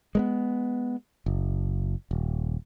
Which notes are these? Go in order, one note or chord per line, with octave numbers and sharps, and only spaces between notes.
G#3 A#3 B3
F#1
D#1